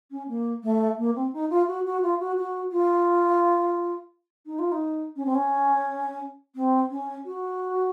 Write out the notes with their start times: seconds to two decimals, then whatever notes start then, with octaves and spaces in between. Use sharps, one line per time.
0.11 C#4
0.28 A#3
0.63 A3
0.98 A#3
1.15 C4
1.33 D#4
1.50 F4
1.67 F#4
1.85 F#4
2.02 F4
2.20 F#4
2.37 F#4
2.71 F4
4.46 D#4
4.59 F4
4.71 D#4
5.16 C#4
5.25 C4
5.35 C#4
6.55 C4
6.90 C#4
7.25 F#4